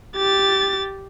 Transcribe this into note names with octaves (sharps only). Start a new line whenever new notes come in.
G4 A6